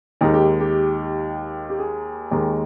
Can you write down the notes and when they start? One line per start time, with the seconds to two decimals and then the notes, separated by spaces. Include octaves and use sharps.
0.21 D#2 D#3 G#3 D#4
0.34 G4
0.60 G4
1.69 G4
1.79 G#4
2.31 D#2 D#3 G#3